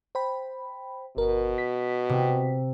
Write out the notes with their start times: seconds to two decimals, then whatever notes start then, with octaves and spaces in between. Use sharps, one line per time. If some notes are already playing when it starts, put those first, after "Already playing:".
0.15 C5 G5 B5
1.17 G1 B2 A#4
1.58 B6
2.09 C3